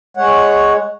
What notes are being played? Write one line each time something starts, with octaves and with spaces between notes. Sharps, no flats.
G#3 C#5 F#5